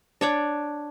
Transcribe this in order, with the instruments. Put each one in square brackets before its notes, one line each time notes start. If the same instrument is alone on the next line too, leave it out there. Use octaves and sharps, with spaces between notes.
[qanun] D4 C#5 D5